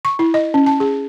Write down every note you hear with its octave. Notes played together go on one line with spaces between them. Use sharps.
C#6
E4
D#5
C#4
A5
G#4